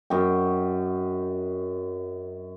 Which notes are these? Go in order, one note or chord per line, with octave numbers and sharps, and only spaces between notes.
F#2 D#5 G5